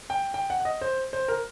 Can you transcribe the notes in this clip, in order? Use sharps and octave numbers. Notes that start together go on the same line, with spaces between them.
G5
G5
F#5
F#5
D#5
C5
C5
A#4